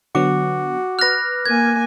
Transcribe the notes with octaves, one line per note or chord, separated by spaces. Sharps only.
D3 F#3 B3 F#4 D6
B4 F6 F#6 A#6
A#3 G#5 G#6